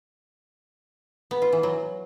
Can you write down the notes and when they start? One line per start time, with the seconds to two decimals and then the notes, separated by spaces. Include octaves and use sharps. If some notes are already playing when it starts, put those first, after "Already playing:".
1.31 B3
1.42 F4
1.53 E3
1.63 F#3